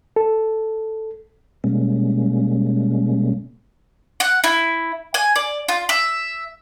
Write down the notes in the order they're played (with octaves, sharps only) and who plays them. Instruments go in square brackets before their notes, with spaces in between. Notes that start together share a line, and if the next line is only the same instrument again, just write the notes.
[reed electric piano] A4
[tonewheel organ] B2 G3 G#3 A#3 C#4
[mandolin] F#5
E4
G#5
D5
F4
E5